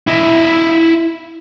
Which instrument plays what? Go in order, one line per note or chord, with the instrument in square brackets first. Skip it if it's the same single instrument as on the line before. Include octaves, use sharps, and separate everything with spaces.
[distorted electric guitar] E4 D#5